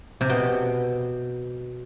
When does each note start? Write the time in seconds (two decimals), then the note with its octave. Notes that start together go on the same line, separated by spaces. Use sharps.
0.21 C3
0.30 B2